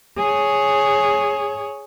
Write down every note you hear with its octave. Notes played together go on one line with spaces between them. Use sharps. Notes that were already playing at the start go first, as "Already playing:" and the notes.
G#4 C#5